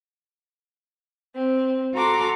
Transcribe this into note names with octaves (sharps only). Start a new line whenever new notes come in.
C4
F#4 A4 A#5 C6 D6